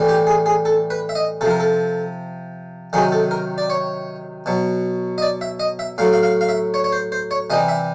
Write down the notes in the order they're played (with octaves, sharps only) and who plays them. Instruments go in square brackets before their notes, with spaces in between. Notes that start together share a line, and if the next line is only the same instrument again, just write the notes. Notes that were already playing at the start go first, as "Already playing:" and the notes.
Already playing: [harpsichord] A2 E3 G3
G4
G#4
G#4
A4
B4
E5
D#5
C3 A4
F3
A#4
A4
C3 D#3 F#3 G#4
A4
A#4
D5
C#5
B2 F#3
D#5
D5
E5
D#5
E5
A2 F#3 F5
F5
F5
F5
E5
C#5
C#5
C5
C5
C#5
C3 E3 G3 D#5
E5